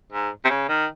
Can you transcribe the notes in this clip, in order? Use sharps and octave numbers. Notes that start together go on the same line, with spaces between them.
G#2
C3
C#3
D#3